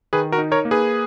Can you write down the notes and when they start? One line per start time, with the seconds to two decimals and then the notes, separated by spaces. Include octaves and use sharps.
0.13 D#3 G#4 B4
0.32 F#4 A#4
0.38 D#4
0.52 A#4 C#5
0.65 A#3
0.71 G#4 B4